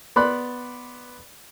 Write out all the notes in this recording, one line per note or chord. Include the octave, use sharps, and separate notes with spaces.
B3 D5 B5 C6 F#6